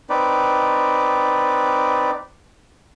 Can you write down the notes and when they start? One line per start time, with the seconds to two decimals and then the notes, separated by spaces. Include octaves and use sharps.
0.10 C4 D#4 B4 D5